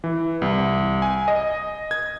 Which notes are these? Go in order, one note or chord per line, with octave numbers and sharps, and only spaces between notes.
E3
C2
G#5
D#5
G#6